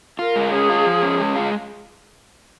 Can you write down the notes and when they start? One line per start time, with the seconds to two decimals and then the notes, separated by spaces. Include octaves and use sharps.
0.19 F4 A#4
0.36 G#3
0.52 C#4 G#4
0.69 F4
0.86 F3
1.03 C#4
1.20 G#3
1.36 F4